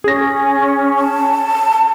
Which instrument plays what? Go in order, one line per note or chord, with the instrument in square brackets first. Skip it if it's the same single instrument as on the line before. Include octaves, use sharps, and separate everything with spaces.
[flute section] C#4 [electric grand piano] G#4 A#6
[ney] A5